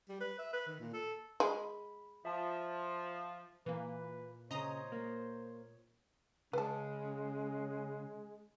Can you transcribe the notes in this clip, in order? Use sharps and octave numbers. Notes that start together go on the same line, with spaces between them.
G3
B4
E5
B4
D#3
A#2
A4
G#3 B5
F3 E5 A5
A#2 E3 A#3 B4
A#2 C#3 C5 C#5 D#5 A#5 D#6
A#3
C#3 G#3 C#4 B4 A5